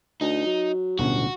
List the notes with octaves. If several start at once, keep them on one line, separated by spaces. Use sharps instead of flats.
D2 D#4
F#3
D1 G1 B2 C#4 F#4